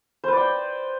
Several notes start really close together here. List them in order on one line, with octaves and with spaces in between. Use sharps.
C5 B4 D5 G5